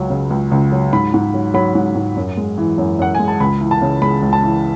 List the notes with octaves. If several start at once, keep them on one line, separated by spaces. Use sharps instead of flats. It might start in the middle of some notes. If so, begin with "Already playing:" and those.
Already playing: C#2 F#3
C#3
C#2
C#2
F#3
G#2 B5
G#2
F#3
F#3 B5
G#2
G#2
F#2
G#3
E3
F#2
F#2 F#5
G#3 G#5
A5
C#2 B5
E3
A5
C#3
G#3 B5
C#2
A5
E3